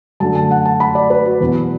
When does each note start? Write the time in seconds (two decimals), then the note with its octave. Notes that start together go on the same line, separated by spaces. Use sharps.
0.20 F#2 D3 A3 A5
0.35 A5
0.51 F#5
0.65 A5
0.80 B5
0.95 D5
1.10 B4
1.25 F#4
1.41 E2 B2 F#3 B3